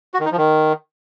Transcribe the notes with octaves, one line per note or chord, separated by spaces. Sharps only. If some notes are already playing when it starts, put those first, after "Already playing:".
F#4
D#3
D#4
F3
D#3